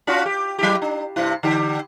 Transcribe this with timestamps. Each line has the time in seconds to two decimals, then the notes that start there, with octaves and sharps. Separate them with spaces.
0.07 C#4 F4 F#4
0.26 G4
0.59 F#3 E4 G4
0.82 D4
1.16 G2 C3 E4
1.43 D3 G4